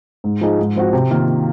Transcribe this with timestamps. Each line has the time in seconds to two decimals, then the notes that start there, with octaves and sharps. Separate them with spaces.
0.24 G#2
0.41 F3 G#3 D#4 G#4
0.59 G#2
0.76 F3 C4 F#4
0.93 C3
1.10 D#3 A#3 F4